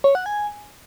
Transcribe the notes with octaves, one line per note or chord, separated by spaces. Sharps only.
C#5
F#5
G#5